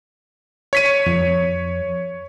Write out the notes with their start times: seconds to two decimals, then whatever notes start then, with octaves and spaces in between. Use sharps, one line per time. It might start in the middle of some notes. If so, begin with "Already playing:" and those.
0.73 C#5 B6 D#7
1.06 F2